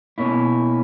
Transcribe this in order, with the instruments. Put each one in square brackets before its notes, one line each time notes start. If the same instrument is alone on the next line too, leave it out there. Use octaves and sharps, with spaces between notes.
[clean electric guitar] B2 A#3 C#4 E4